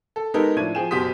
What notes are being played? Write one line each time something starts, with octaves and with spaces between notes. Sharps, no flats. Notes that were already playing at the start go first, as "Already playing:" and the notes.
A4
G#3 B3 D#4 G4 A4 A#4
A2 F3 D4 E4 G#6 D#7
F3 G#4 G5 G#5 E7
F#1 B2 G4 C6 D#6 B6